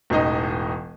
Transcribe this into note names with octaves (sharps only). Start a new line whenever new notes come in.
E1 A1 D#4 D#5